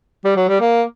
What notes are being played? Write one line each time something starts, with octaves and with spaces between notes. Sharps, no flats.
G3
F#3
G3
A#3